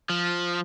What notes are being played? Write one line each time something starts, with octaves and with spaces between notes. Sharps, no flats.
F3